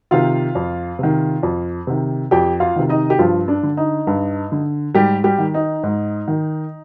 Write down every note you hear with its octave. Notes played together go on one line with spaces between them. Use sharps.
C3 D#3 F4 F5
F2
C3 D#3
F2
C3 D#3
F2 G4 G5
F4 F5
C3 D#3
D#4 D#5
G4
G2 F3 F4
D4
D3
D#4
G2
D3
G#2 G3 G4
G3 G4
D#3
D#4
G#2
D#3